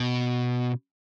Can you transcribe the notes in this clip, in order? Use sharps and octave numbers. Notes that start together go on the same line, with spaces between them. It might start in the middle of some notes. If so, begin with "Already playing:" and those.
Already playing: B2